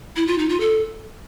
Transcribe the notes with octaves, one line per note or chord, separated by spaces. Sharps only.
E4
F4
D#4
F4
A4